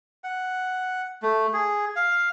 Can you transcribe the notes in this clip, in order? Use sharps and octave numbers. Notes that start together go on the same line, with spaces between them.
F#5
A3
G#4
F5